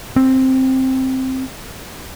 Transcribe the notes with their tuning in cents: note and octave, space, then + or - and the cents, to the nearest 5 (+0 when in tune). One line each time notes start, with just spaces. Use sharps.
C4 +5